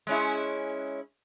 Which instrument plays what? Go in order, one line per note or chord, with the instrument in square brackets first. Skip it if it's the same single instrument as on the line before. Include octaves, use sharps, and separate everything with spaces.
[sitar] G#3 C#4 E4